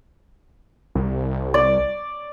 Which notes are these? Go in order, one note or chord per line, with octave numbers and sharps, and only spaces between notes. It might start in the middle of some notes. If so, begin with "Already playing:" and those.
C2
D5